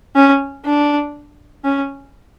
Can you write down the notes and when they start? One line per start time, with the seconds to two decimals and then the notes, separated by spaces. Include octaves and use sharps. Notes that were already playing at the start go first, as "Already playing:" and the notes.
0.15 C#4
0.65 D4
1.64 C#4